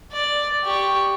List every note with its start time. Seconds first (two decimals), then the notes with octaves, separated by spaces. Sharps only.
0.12 D5
0.64 G4 C#6